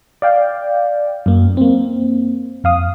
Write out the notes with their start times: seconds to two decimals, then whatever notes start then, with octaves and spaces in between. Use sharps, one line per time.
0.22 D5 F5 G5
1.26 F#2 A#3
1.57 A#3 C4
2.64 F2 F5 D#6